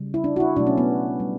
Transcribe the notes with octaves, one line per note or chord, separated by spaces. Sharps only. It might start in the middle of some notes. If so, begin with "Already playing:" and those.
Already playing: C#3 G3
E4
D4
F#4
E4
B2 F#3 A3 D4
C#4
B3
G3